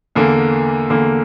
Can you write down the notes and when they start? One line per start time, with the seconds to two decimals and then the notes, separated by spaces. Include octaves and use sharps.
0.15 E2 D3 A#3
0.90 E2 D3 A#3